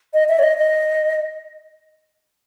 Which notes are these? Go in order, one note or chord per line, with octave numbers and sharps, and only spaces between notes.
D#5
E5
C#5
D#5
D#5